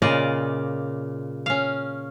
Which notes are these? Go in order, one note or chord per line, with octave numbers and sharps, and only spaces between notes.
A#2 C#3 F4 D5 D#5
C#4 F5